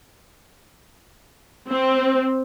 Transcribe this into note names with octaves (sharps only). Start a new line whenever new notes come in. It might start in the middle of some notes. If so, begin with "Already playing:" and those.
C4